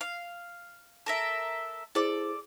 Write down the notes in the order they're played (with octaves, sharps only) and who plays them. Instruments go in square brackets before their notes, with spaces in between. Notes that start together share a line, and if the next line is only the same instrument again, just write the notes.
[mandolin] F5
A4 A#4 E5
[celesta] E4 G#4 C5 [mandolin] A4 D5